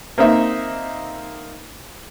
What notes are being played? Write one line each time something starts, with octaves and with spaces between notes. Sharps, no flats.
A#3 C4 D#4 E5